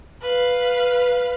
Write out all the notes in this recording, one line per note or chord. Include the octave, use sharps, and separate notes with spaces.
B4 F5